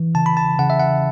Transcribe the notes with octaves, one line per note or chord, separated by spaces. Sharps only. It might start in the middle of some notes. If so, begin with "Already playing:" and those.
Already playing: E3
C#3 A5
B5
A5
C#3 F#5
E5
F#5